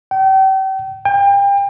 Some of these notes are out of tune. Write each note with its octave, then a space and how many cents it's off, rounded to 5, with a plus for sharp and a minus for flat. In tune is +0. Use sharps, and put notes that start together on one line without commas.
G5 -35
G5 +35